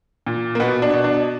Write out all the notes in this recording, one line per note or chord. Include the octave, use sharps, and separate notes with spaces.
A#2
A#3
B2 B3
D4
B2
D4